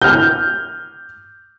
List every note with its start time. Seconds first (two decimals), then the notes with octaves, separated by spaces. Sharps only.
0.02 F6 G6